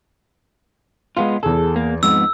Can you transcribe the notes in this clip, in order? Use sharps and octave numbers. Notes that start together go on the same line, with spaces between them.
G#3 B3 F4 F5
E2 G#4 A4
A#3
F2 G#2 B3 E6